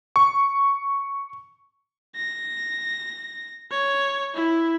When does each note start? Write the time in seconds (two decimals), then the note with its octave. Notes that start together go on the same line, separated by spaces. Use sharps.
0.16 C#6
2.16 A#6
3.71 C#5
4.34 E4